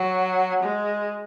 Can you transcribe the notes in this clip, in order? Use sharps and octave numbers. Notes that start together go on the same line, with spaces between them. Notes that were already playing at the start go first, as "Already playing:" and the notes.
Already playing: F#3
G#3